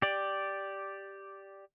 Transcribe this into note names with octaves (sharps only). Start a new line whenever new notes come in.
G4 D5